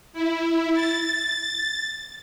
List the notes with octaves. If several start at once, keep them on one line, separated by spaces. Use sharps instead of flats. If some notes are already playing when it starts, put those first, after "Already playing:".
E4
A6